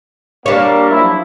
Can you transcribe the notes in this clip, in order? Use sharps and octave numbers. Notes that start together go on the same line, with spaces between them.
G3 A#3 D4 C#5
F3 F#3 E4